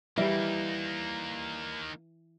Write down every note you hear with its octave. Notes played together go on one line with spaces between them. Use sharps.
E3 G3 A#3 D#4